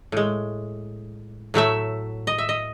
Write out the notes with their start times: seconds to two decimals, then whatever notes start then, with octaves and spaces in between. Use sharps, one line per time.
0.12 A2 G#3
1.54 A2 F#3 A3 E5
2.27 D#5
2.38 E5
2.49 D#5